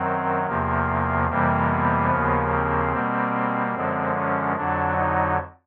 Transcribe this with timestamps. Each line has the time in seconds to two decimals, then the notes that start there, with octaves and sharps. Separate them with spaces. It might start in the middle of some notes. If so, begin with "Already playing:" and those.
Already playing: F#2 D#3 F#3 C4
0.47 E2 C3 F3 A#3
1.29 F2 C3 E3 G3 A#3
1.70 B3
2.10 D#2 C#3 F3 A#3
2.52 C4
2.93 B2 G3 A#3
3.74 F#2 D3 F3 G#3 C4
4.15 C#4
4.57 F2 D3 F#3 D4
4.98 D#4